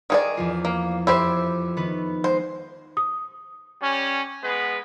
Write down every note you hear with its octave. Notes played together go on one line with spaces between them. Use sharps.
D#3 G#4 D5
E2 F3 F4
A#3
F2 E4 G4 C5
D#3 B3 B4
G#3 C5
D#6
G3 C#4
G#3 B3 B4